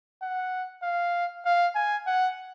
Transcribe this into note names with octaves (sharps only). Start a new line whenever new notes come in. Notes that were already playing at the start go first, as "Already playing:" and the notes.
F#5
F5
F5
G#5
F#5